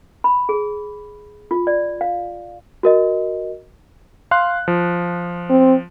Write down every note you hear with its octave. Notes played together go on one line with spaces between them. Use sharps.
B5
G#4
F4
D5
F5
F#4 A#4 D#5
F5 C6 F#6
F3
C4